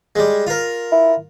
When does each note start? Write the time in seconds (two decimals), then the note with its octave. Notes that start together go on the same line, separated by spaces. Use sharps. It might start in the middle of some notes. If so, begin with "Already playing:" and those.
0.16 G3 G#3
0.47 F4 A#4
0.92 E4